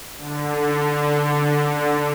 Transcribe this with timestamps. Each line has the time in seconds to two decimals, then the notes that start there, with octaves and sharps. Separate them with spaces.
0.17 D3